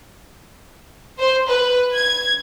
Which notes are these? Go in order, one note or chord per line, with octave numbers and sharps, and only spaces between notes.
C5
B4
G#6